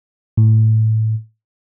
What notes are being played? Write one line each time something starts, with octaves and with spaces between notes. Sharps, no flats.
A2